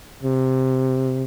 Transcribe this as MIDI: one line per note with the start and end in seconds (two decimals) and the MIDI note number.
0.23 1.24 48